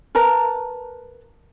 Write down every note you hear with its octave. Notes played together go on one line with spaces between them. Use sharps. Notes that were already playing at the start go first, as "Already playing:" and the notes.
A#4 B4 A5 A#5